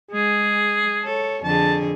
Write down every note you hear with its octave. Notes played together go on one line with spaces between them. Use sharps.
G#3 G#4
A4 C#5
F2 D3 G#4 A5